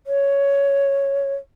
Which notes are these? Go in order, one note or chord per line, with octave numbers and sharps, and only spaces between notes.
C#5